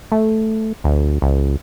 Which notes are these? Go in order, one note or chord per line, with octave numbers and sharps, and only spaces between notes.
A3
D2
C#2